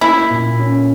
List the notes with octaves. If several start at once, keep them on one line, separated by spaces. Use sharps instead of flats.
A#3 E4
A#2
C#4